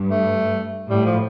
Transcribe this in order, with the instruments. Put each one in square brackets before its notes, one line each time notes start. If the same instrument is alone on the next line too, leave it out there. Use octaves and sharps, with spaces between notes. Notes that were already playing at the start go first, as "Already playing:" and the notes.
Already playing: [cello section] G2
[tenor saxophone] A3
[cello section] A2 [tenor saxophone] G3
[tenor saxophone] F3